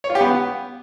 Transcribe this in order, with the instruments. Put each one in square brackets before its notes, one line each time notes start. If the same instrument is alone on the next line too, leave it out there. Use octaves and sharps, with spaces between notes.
[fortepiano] C#5
F4
G4
B3